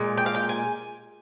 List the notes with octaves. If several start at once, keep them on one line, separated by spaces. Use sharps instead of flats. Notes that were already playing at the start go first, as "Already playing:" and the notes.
Already playing: A#2 G#3
G5
F5
G5
G#5